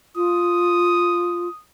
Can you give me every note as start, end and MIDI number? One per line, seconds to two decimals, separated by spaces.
0.16 1.48 65
0.16 1.60 87